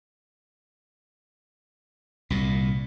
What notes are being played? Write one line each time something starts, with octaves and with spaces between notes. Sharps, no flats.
C2 A#2